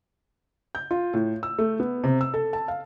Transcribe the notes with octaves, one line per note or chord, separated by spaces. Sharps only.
G6
F4
A2
E6
A3
B3
C3
E6
A4
A5
F5